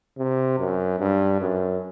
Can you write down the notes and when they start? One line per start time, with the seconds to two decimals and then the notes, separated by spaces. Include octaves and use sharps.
0.18 C3
0.59 F#2
1.00 G2
1.41 F#2